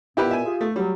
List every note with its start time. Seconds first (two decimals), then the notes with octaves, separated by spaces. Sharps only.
0.17 A#2 B3 E4 G4 B4
0.31 E5 G#5
0.45 F4 G4 G#4
0.61 A3
0.76 F#3 G3